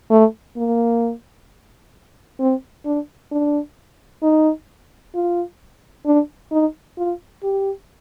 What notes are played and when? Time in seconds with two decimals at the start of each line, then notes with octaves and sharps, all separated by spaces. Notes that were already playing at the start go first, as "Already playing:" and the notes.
0.11 A3
0.57 A#3
2.40 C4
2.85 D4
3.31 D4
4.23 D#4
5.15 F4
6.06 D4
6.52 D#4
6.98 F4
7.43 G4